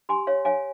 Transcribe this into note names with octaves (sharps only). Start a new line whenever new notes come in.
G4 G#5 C6
C#5 F5
C#5 F5 G#5